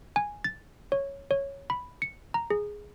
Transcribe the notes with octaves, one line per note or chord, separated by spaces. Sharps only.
G#5
A6
C#5
C#5
B5
C#7
A#5
G#4